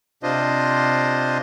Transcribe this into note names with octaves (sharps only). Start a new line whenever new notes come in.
C3 D4 F4 C5 D#5